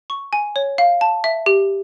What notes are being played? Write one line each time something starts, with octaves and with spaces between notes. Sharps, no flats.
C#6
G#5
C#5
F5
A5
E5
G4